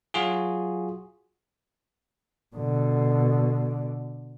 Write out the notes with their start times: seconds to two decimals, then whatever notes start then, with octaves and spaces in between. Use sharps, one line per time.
0.14 F#3 F4 F#4 G#4
2.56 B2 D3